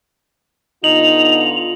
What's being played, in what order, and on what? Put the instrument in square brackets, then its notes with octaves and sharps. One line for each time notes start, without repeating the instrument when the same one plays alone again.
[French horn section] D3 B3 F4 [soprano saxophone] D#4 [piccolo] F7 [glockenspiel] F#7